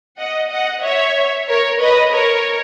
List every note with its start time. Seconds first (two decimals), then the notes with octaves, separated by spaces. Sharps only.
0.18 D#5 F#5
0.51 D#5 F#5
0.83 C#5 E5
1.48 A#4 C#5
1.80 B4 D#5
2.12 A#4 C#5